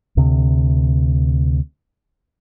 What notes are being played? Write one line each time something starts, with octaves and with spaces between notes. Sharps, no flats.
D2 C3